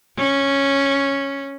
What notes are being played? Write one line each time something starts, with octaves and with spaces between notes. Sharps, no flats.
C#4